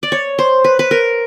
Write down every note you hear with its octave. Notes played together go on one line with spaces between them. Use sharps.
D5
C#5
C5
B4
B4
A#4